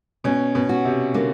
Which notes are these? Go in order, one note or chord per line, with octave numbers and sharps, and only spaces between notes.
B2 C#4
B2
F#4
C3
D3 A#3